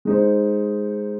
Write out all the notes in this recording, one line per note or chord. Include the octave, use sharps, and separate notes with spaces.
G#3 D#4 C5